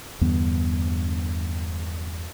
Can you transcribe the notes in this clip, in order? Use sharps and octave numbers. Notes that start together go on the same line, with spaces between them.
E2 G2 D3 B3